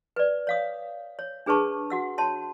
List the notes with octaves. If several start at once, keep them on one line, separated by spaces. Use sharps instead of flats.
B4 D5
C#5 F5 D#6
C#5
D4 G#4 B4 A5 C#6
F#4 F#5 E6
C#5 A5 C6